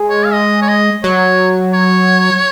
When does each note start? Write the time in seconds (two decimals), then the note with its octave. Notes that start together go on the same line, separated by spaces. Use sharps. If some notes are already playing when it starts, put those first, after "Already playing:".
Already playing: G#3
0.10 C#5
0.25 F5
0.33 D#5
0.62 C#5
0.68 D#5
1.04 F#3 C#5
1.74 C#5